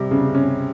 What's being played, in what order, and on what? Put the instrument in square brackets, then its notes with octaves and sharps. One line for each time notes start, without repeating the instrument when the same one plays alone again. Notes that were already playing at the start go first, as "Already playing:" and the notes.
Already playing: [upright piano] C3 [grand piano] G3 G4
[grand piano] C#3
C#4